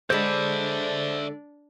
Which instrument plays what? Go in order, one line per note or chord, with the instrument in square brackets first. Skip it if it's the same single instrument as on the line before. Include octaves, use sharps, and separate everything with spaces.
[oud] D3 G#3 [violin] D4 [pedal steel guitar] C5 B5 [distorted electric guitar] D5 E5